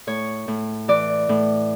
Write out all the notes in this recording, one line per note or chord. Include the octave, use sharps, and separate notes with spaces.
A2 C#5
A2
E3 D5
A2